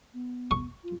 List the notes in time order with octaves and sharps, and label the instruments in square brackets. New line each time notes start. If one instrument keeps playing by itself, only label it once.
[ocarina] B3
[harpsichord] C#6
[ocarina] F4